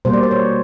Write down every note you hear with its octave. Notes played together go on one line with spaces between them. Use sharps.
B2 G3 A#3 C5
D5
C5
C#5